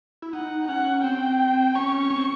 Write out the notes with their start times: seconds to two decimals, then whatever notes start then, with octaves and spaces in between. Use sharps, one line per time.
0.22 E4
0.33 D#4 F#5
0.68 C#4 F#5
1.04 C4 G5
1.75 C#4 C#6
2.10 C#4
2.18 C4